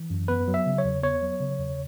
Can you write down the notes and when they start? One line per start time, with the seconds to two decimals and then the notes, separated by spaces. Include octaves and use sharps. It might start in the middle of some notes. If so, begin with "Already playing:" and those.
Already playing: E3
0.10 F#2
0.28 B3 B4
0.48 F#3
0.54 E5
0.66 C#3
0.78 C#5
0.84 E2
1.03 B3 C#5
1.22 F#3
1.40 C#3
1.59 E2